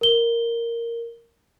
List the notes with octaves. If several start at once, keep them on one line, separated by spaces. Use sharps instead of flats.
A#4 G7